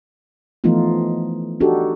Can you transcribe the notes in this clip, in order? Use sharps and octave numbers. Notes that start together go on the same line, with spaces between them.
E3 F3 A3 B3 D#4 F4
D4 D#4 F#4 G4 A4